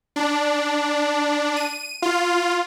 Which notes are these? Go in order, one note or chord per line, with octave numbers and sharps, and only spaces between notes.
D4
D#7
F4